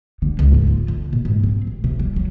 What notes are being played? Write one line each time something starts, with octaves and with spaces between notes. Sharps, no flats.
D3
C#2
G#2
F4
D3
A#2
G#2
C4
A#1
C3
G3
F#3